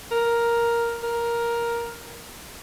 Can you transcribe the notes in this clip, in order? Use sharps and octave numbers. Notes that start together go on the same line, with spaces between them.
A#4
A#4